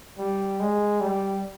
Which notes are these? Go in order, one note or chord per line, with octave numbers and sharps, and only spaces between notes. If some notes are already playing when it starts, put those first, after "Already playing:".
G3
G#3
G3